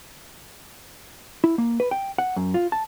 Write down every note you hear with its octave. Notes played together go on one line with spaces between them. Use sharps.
E4
A#3
B4
G5
F#5
F#2
F4
A5